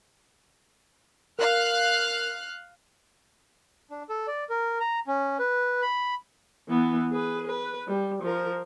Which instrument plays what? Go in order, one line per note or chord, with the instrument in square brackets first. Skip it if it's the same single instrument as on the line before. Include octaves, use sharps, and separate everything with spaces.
[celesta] A#4 [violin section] F5 F6 F#6
[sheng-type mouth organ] D4
A4
D5
A#4
A#5
C#4
B4
B5
[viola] E3 B3
G#4 B4
B4
G3
F3 A#4